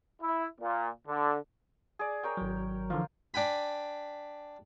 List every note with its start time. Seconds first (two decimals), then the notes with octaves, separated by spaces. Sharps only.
0.21 E4
0.61 A#2
1.08 D3
1.99 G#4 D5
2.23 A#4 C#5 G5
2.37 G#1 F#3
2.90 D3 E3 F3 F4
3.34 D4 G5 G#5 B5